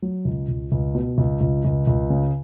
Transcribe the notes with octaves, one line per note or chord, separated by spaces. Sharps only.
F#3
C#2
C#2
C#2
B2
C#2
C#2
C#2
C#2
C#3